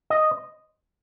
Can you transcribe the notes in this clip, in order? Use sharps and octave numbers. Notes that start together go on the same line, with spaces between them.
D#5